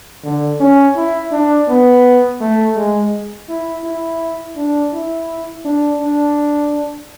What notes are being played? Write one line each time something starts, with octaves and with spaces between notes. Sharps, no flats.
D3
C#4
E4
D4
B3
A3
G#3
E4
E4
D4
E4
D4
D4